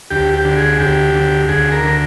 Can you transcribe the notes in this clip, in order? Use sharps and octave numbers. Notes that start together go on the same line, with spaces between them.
D2 G4
G4
D3
G#4
D2 G4
D3
D2 G#4
A#4
D3